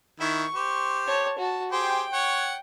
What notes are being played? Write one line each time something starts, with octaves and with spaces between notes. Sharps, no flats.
D#3 E4 C#6
G4 C5
C#5 A5
F#4 A5
G4 G#4 C5 G5
C#5 F#5